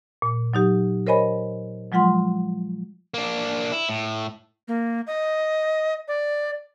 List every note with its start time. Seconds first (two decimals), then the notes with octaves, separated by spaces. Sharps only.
0.22 A#2
0.54 F#3 D#4 G4 D#6
1.07 A#4 C5 C#5 D#5 G#5 B5
1.92 F3 F#3 G#3 F4 F#5 C6
3.14 A#3 D4
3.72 E4
3.89 A2
4.68 A#3
5.07 D#5
6.08 D5